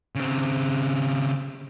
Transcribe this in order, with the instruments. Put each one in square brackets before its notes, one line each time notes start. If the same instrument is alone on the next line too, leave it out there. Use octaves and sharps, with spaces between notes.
[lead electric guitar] C#3 C4